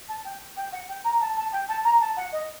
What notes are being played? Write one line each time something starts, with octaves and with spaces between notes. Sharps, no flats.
A5
G5
G5
F#5
G5
A#5
A5
A5
G5
A5
A#5
A5
F#5
D#5